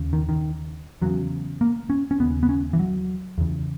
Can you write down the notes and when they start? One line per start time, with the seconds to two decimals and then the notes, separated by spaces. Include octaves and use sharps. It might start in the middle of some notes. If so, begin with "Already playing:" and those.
Already playing: D#2 C#3
0.13 D#3
0.29 D#3
1.02 E2 C#3 F#3
1.61 A#3
1.90 C#4
2.11 C#4
2.19 D#2 C#3 B3
2.43 B3
2.49 C#4
2.73 E3
2.79 F#3
3.38 E2 C#3